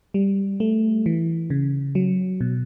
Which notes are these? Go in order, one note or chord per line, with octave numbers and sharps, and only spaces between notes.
G3
A3
E3
C#3
F#3
B2